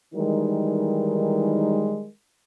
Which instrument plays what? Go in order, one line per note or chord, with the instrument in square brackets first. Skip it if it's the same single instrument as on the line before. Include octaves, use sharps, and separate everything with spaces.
[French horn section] D#3 E3 G3 G#3 D#4 A#4